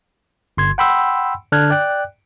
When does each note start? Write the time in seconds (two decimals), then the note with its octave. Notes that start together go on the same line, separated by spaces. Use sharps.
0.57 G1 C6 G#6
0.78 F#5 G5 B5 C6 E6
1.52 D3 D4 F6 F#6 G#6
1.70 D5 G5 F#6